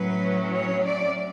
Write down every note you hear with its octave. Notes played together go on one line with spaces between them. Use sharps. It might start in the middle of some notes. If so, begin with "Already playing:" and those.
Already playing: A2 F#3 C#4 B4
C#5
D5